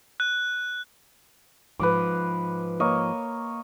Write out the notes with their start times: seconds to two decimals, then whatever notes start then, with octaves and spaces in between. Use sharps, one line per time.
0.20 F#6
1.80 G#2 F3 B4 D6
2.80 A#3 C#5 D#5